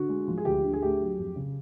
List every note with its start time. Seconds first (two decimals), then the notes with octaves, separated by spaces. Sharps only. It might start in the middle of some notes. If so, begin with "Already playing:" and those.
Already playing: D3 F#4
0.09 G#3
0.28 F3
0.38 G#4
0.45 D2 G4
0.64 D3
0.73 G#4
0.82 A3 G4
1.01 F#3
1.19 F2
1.36 C#3